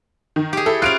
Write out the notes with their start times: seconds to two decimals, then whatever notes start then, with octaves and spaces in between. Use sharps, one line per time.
0.36 D#3
0.53 G4 G#4
0.66 E4 A4
0.82 C#4 F4 F#6 D7 F7